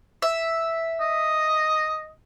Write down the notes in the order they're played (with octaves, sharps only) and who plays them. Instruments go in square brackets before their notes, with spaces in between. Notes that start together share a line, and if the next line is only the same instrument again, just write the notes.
[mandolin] E5
[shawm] D#5